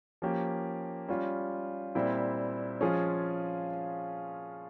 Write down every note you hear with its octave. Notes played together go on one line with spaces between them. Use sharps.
F3 A#3 C#4 G4
G3 C#4 F4
A#2 G3 C4 E4
F3 G#3 C#4 F4 G#4